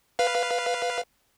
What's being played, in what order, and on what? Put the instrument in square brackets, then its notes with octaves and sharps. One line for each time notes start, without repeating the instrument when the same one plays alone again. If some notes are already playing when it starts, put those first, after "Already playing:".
[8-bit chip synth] B4 F5